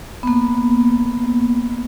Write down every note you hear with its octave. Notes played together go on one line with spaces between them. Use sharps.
A#3 B3